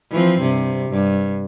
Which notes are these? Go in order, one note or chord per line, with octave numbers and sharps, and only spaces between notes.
E3 F3 C4
G2 C3
G2